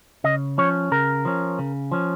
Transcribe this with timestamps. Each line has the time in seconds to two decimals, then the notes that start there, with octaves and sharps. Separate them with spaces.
0.24 C#3 D#5
0.58 F3 C#4 C#5
0.92 C#3 A#4
1.25 F3 C#4
1.59 C#3
1.92 F3 C#4